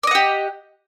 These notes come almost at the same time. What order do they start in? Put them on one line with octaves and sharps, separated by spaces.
D5 D#5 F#5 G4